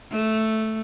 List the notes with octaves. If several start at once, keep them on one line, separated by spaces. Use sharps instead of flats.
A3